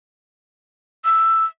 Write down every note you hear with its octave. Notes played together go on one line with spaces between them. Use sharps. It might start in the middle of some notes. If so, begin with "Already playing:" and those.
E6